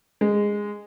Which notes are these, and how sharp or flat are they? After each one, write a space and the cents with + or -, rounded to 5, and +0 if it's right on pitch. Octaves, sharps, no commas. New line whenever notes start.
G#3 -10